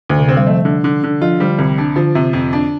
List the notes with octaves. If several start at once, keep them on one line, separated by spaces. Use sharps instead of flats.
D2 D3
C3
D3 C4
G3
F3 A3
D3
D3
D3
F3 F4
D3 G3
C2 D3
D4
D3 F3
C3
F2
D4